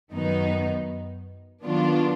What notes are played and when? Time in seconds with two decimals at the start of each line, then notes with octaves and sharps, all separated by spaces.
0.13 F#2 D#3 F#3 B3 D#4
1.65 D#3 F#3 B3 D4 F4